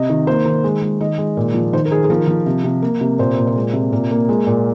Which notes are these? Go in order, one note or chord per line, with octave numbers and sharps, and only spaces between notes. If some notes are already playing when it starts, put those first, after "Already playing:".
Already playing: C3 D#5
D#3
A#3 C5
D#3
G#3
G#3
D#3 D#5
G#3
A#2
F3
D#3 C5
A#4
D#3 G#4
G#4
F3 A#4
F3
C3
C3
A#3
C3
A#2 C5
A#2 A#4
C5
G#3
C3
A#2 A#4
A#3
G#3
A#2